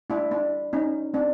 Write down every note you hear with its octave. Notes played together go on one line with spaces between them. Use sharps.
D4 E4
D4 E4
C#4 D#4
C4 D4